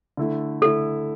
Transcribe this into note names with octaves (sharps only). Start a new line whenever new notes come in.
D3 A3 E4
D3 A3 E4 A4